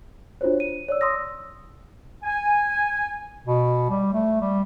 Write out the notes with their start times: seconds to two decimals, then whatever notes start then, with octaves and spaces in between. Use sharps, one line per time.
0.41 D4 F4 F#4 C5 C#5
0.60 D#7
0.88 C#5 D5 E6
1.01 C6 D#6 E6 A#6
2.24 G#5
3.47 B2
3.90 G3
4.13 A3
4.41 G3